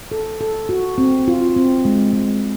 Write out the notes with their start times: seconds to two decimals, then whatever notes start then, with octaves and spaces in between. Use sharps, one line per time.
0.12 A4
0.41 A4
0.69 F#4
0.98 C4
1.28 F4
1.56 C4
1.85 G#3
2.13 G#3